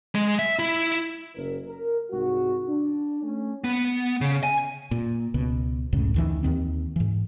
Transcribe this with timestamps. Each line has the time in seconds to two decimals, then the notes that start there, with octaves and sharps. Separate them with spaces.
0.15 G#3
0.39 E5
0.59 E4
1.35 F#1 A#4
1.67 A#4
2.11 C2 G#2 G#3 F#4
2.68 D4
3.23 A3 C#4
3.64 B3
4.21 C#3
4.44 G#5
4.91 A#2
5.34 C#2 B2
5.93 C#2 F#2 A2 C#3
6.14 D2 D#3 E3
6.43 D#2 D#3 C4
6.96 G#2 E3